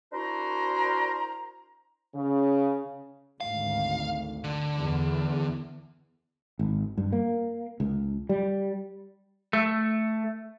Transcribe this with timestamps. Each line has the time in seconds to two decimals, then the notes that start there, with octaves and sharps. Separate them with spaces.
0.13 D4 E4 F#4 A#4 C5 A#5
2.14 C#3
3.41 G#1 D2 F5
4.44 D3
4.77 E2
6.59 G#1
6.98 G2
7.12 A#3
7.80 C#2
8.29 G3
9.53 A3